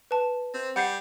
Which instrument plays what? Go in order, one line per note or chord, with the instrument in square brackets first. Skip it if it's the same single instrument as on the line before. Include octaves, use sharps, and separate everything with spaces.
[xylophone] B4 A5
[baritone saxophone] C4
[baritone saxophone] G3 [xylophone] F#5 G6 C7